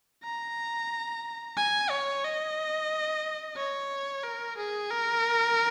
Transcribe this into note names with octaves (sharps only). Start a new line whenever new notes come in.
A#5
G#5
C#5
D#5
C#5
A#4
G#4
A#4